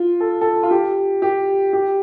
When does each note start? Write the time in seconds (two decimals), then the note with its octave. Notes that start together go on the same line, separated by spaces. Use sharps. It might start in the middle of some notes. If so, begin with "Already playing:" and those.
Already playing: F4
0.20 A4
0.41 A4
0.63 F4
0.71 G4
1.22 G4
1.73 G4